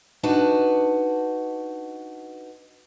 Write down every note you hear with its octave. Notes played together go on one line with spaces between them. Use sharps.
D4 D#4 F#4 B4 A5